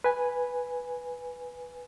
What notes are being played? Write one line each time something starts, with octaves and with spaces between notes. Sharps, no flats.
B4 G#5